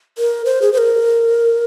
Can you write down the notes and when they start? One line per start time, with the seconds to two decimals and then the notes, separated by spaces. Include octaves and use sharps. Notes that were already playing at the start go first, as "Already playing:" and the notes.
0.18 A#4
0.45 C5
0.62 G#4
0.73 C5
0.78 A#4